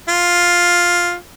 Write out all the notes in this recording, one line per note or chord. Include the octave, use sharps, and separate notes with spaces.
F4